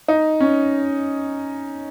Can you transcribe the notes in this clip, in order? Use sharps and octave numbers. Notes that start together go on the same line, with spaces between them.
D#4
C#4